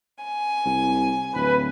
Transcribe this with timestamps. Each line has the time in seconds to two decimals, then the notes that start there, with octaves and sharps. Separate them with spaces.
0.23 G#5
0.66 C2
1.34 D1 B4